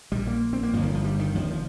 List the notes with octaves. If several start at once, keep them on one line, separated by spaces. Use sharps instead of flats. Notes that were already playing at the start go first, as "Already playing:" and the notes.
A#1 A#2 G3
A#3
C4
A#3
G1 G2 F3
D#3
F3
G3
D#3
F1 D#2 F3
F3